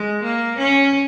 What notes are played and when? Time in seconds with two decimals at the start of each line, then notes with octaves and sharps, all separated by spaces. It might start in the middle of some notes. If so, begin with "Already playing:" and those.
Already playing: G#3
0.23 A#3
0.58 C#4